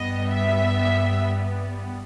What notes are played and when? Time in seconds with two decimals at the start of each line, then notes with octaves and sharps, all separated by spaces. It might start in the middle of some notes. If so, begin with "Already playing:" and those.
Already playing: G2 G3 B3 D#5
0.32 E5